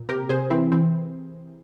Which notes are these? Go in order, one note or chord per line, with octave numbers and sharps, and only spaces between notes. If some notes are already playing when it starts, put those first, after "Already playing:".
Already playing: A#2
C3 G4 A#4
C3 G#4 C5
E3 C4 E4
E3 C4